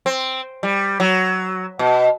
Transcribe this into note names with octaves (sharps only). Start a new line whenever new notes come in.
C4
G3
F#3
B2